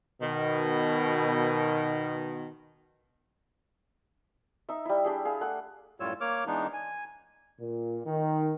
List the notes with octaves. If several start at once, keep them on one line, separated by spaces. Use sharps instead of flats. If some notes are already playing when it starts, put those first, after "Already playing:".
B2 D#3
D#4 E5
G3 E4
D4 G4 G#4
G#4 F5
A3 F#5
F#2 A2 G3 F4 C#5 E6
A#3 C#5 D6 F6
E3 G#3 B3 D4 D#4
G#5
A#2
D#3